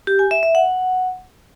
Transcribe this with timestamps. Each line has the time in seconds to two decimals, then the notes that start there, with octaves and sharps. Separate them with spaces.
0.07 G4
0.19 G#5
0.31 E5
0.43 E5
0.55 F#5